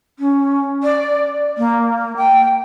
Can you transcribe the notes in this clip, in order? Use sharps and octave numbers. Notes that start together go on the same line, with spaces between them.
C#4
D5
A#3
G5